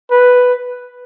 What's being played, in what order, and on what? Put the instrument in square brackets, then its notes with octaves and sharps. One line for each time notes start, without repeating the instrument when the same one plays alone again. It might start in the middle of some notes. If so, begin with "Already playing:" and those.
[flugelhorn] B4